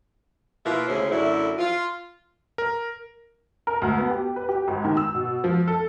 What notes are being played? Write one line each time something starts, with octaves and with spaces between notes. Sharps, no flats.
B2 A#3 E4 F4
D2 C#3 E4 G#4 C5
F#2 D3 A3 E4
F4
A#4
A#4
D2
B3
G4
B4
G4
G#1
D#3
E6
B2
F3
A4